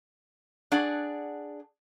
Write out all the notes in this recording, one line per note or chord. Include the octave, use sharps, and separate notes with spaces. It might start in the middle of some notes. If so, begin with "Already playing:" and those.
D4 G#4 D5 F#5